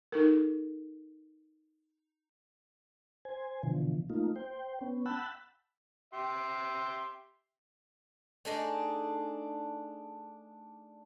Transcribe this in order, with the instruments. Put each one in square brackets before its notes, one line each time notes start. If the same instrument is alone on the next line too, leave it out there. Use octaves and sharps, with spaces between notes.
[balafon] D#4 A4 A#4
[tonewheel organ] C5 G#5
B2 D3 E3 F3
A3 A#3 D#4 F4
C5 G5
B3 C#4
F#5 G5 A5 B5 E6 F#6
[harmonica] G4 E5 C6
[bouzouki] A3 D4 D#4 G#4